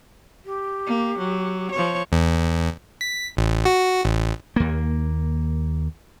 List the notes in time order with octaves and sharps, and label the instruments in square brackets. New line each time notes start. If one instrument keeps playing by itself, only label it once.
[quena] G4
[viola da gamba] A#3
F#3
F3 C#5
[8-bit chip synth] E2
B6
A1
F#4
A1
[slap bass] D#2 A#3